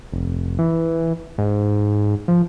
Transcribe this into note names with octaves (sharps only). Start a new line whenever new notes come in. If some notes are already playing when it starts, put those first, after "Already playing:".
F1
E3
G#2
F3